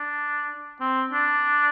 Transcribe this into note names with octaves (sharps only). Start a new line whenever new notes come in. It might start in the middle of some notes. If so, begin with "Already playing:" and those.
Already playing: D4
C4
D4